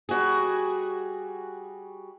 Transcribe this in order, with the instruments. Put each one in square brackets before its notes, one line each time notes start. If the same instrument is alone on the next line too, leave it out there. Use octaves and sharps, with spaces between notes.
[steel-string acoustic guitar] G3 F#4 G#4